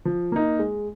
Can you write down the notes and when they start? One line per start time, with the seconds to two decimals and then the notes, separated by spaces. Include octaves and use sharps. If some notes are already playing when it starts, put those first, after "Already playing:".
0.05 F3
0.32 A#3 D#4
0.59 G#3